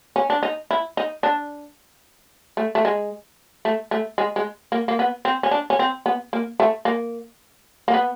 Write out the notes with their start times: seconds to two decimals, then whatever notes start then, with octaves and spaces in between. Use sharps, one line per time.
0.16 C#4
0.30 D4
0.43 D#4
0.71 E4
0.97 D#4
1.23 D4
2.57 A3
2.75 A3
2.85 G#3
3.65 A3
3.91 A3
4.18 G#3
4.36 G#3
4.72 A#3
4.88 A#3
4.99 B3
5.25 C4
5.43 C#4
5.51 D4
5.70 C#4
5.79 C4
6.06 B3
6.33 A#3
6.60 A3
6.85 A#3
7.88 A#3
7.94 B3